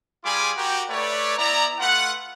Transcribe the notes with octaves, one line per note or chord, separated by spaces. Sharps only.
G3 F4 G#4 G#5 B5 D6
F#4 G4 A#4 F#5 G5
A3 B4 C#5 D5
B3 E4 D5 A#5
A3 F4 B4 F#5